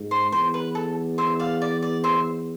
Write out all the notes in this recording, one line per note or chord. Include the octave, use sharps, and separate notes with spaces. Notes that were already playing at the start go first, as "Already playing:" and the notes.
Already playing: G#2
C5
E2 C5
B4
A4
C5 E5
D5 F5
D5
D5
C5 E5